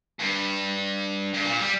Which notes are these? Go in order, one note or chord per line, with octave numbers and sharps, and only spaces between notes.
G2
G2
A#2
G3